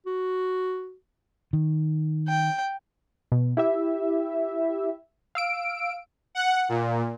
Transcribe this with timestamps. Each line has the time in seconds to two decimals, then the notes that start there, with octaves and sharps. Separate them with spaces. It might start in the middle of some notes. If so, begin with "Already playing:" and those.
0.06 F#4
1.53 D#3
2.28 G5
3.32 B2
3.57 E4 G4 E5
5.35 F5 E6 D7
6.35 F#5
6.69 A#2